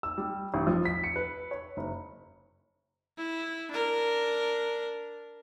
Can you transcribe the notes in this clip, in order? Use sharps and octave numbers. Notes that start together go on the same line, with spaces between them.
E6
G3
A1
F3
B6
C#7
B4
C#5
F#1
E4
D4 A#4